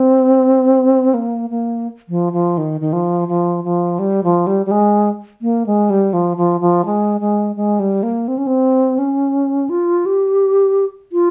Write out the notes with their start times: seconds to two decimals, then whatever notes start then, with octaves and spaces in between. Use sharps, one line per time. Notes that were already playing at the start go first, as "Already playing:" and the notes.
Already playing: C4
1.14 A#3
1.50 A#3
2.09 F3
2.33 F3
2.58 D#3
2.81 D#3
2.93 F3
3.28 F3
3.64 F3
3.99 G3
4.24 F3
4.47 G3
4.66 G3
4.71 G#3
5.42 A#3
5.66 G#3
5.90 G3
6.13 F3
6.37 F3
6.61 F3
6.85 G#3
7.21 G#3
7.56 G#3
7.80 G3
8.03 A#3
8.28 C4
8.38 C#4
8.47 C4
8.99 C#4
9.69 F4
10.06 G4
11.12 F4